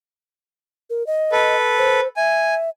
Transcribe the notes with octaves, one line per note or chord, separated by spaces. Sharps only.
A#4
D#5
A4 B4
C5
E5 G#5